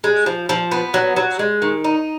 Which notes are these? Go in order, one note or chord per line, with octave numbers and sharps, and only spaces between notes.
G#3
F3
F3
B3
F#3
F#3
G#3
D#3
D#4